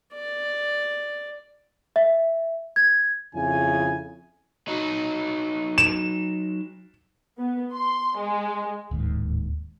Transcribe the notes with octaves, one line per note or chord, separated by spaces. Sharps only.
D5
E5
G#6
F2 C#3 E4 G#5
F#3 D#4
E7
B3
C6
G#3
D1 D#2 G#2